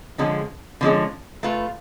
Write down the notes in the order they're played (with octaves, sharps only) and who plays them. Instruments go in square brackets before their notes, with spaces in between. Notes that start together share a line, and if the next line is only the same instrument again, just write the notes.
[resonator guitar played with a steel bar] D3 F3 G#3 C#4
D3 F3 G#3 C#4
A3 F4 B4